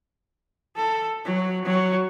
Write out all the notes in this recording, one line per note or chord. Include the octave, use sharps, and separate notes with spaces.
A4
F#3
F#3